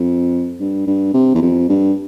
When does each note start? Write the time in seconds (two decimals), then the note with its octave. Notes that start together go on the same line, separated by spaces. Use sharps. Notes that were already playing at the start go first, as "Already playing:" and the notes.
Already playing: F2
0.60 G2
0.87 G2
1.14 C3
1.35 E2
1.42 F2
1.69 G2